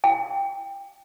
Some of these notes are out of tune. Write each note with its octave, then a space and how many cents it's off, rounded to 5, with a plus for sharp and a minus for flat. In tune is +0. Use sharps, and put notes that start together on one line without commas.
G5 +15